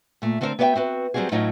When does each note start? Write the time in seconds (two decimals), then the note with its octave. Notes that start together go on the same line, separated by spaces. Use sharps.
0.22 A#2 A3
0.41 D3 C4 D4 F#4 A#4 C5
0.59 B3 F#4 G4 D5 E5 G5
0.75 C4 F#4 B4
1.14 F#3 G3 C4 D4 F#4 G#4
1.32 A2 F#3 C#4 D#4 F4 F#4